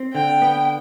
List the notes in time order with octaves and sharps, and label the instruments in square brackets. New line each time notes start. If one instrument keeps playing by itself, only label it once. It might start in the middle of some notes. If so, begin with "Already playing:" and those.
Already playing: [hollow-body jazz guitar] C4
[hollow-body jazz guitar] D3 [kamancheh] G5
[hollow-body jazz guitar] B3